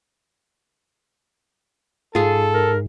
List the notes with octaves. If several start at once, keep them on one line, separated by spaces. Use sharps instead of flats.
G#2 F4 G#4 A4
A#4